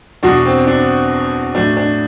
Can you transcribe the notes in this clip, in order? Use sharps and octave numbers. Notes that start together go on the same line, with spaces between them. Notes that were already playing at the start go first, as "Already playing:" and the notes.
E2 B2 F#3 D4 F#4
C4
D4
A2 F#3 D4
D4